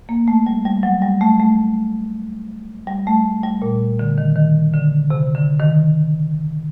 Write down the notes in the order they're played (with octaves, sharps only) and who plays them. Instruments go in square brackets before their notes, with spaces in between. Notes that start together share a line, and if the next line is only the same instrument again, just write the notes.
[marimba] A#3
A3
G3
G3
F#3
G3
A3
A3
G3
A3
G3
A#2
D3
D#3
D#3
D3
C3
D3
D#3